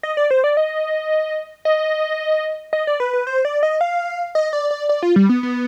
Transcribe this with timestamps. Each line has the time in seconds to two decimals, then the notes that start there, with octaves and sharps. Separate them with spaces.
0.03 D#5
0.17 D5
0.31 C5
0.44 D5
0.57 D#5
1.65 D#5
2.73 D#5
2.87 D5
3.00 B4
3.13 B4
3.27 C5
3.45 D5
3.63 D#5
3.81 F5
4.35 D#5
4.53 D5
4.71 D5
4.89 D5
5.03 F4
5.16 G3
5.29 B3
5.43 B3